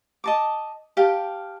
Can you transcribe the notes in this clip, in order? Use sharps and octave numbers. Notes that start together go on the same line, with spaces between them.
D#5 A5 D6
G4 F5 G5 A5